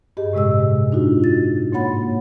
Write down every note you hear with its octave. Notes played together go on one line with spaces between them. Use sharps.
G2 G4 G#4 D#5
A2 C3 G#3 D#5 E6
D4 D#4 F4 F#4
A6
G#2 A#3 C#5 F#5 B5 A6